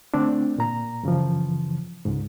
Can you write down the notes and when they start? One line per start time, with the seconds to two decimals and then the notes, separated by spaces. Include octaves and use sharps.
0.14 D3 A3 C4 D4
0.58 A#2 A#5
1.03 F#2 C#3 E3 F3
2.05 C#2 G#2